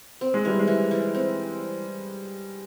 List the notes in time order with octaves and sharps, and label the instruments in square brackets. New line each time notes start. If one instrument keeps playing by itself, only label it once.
[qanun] C4
[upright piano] G#3
[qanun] E3 [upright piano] G3
[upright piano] G#3
[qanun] E3
E3
C4